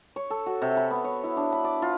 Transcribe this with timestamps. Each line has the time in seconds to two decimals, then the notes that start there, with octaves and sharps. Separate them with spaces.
0.16 C#5
0.30 A4
0.46 F#4
0.62 C3
0.77 B5
0.91 B3
1.04 C#5
1.24 E4
1.37 D4
1.52 B5
1.64 D5
1.82 F4